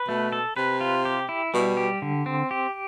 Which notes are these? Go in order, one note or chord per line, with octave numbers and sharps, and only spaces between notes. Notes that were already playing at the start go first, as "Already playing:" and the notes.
Already playing: B4
B2 A3
A4
C3 B4
F4
G4
E4
B2 G3
G4
D3
C4
G4